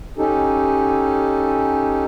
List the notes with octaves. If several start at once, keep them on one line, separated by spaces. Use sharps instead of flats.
C#4 D#4 G4 A4